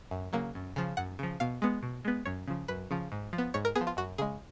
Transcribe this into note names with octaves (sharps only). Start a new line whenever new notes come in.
F#2
C#3 F#3 A#3
F#2
C#3 F3
F#2 F#5
C#3 F3
B2 F5
G#3 B3
B2
G#3 B3
F#2 C#5
C#3 F3
F#2 B4
C#3 F3
G#2
F3
B3
G#2 C#5
A#4
B3 G#4
F3
F4
F#2 F#4
C#3 G#3 G#4